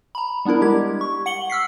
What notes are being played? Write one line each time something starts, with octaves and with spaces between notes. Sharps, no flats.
A#5 B5
G3 B3 D4 E4 A#4
G3 G#3 G4 G#6
C#6
F#5 C#7 F#7 G7
E6 F6 B6 C7